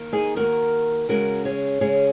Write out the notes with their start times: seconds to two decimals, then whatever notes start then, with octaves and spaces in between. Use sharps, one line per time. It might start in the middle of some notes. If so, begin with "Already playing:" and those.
Already playing: D#2 D#3 A#3
0.13 D#4 G#4
0.37 D#2 D#3 A#3 F#4 A#4
1.09 C#3 G#3 C#4 F#4 A#4
1.45 G#4 C#5
1.81 C#3 G#3 C#4 G#4 C#5